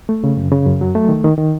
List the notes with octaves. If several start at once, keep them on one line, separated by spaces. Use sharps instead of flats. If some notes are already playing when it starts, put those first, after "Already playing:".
A3
C#3
F#2
C#3
F#2
F#3
A3
D#3
D#3
D#3